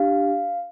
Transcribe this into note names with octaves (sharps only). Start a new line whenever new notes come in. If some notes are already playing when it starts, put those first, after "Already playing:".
Already playing: D4 G4 F5